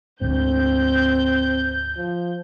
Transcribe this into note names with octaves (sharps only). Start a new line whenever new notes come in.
D2 G#2 C4 G6
F3